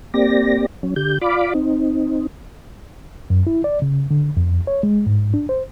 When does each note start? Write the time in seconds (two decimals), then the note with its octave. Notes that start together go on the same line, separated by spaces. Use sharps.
0.14 A#3 C4 G4 D5 A#6
0.83 F#3 C#4
0.96 D3 G4 G6
1.21 F4 D5 F5 B5 D6
1.54 C4 D#4
3.30 F#2
3.47 E4
3.64 D5
3.82 C#3
4.11 D3
4.37 F2
4.67 C#5
4.83 G#3
5.07 G#2
5.34 D4
5.49 C5